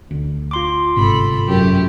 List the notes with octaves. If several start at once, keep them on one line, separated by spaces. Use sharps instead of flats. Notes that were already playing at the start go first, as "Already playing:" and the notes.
D2
F4 C6 D6
G1 G#2 C3 A4 B5
F#2 A3 G4